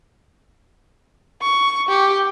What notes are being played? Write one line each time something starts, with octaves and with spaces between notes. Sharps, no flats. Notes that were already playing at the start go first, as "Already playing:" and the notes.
C#6
G4